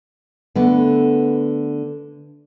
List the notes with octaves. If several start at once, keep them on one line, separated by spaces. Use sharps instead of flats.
D3 A3 B3